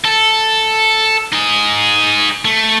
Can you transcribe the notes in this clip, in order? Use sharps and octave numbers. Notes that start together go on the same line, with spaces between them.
A4
D#4 G#4
A3